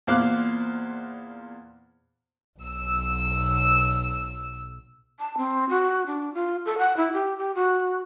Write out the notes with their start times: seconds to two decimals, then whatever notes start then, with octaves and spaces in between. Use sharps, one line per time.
0.07 E2 A#2 C5 F5 D6 F#6
2.60 B1 E6
5.18 A5
5.37 C4
5.69 F#4
6.06 D4
6.34 F4
6.65 A4
6.78 F#5
6.97 E4
7.13 G4
7.38 G4
7.55 F#4